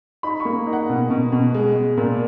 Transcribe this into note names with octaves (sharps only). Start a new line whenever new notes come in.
D#4 B5
C#6
A#3
D#4
F#5
B2
B2
B2
G#3
G#3
A#2